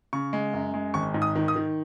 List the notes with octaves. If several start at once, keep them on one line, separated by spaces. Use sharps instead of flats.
C#3 C#6
G#3
F#2
G#3
G#1 C#6
G#2
D#6
D#3
D#6
D#3